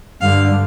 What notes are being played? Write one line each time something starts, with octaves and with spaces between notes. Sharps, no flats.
G2 D3 F5